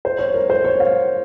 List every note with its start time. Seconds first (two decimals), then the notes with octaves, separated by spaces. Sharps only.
0.05 C5
0.19 C#5
0.34 A#4
0.50 C5
0.64 C#5
0.80 F5